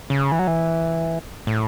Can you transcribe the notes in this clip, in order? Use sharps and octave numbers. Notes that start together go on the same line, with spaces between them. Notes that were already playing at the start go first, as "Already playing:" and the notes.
C#3
E3
F#3
E3
A2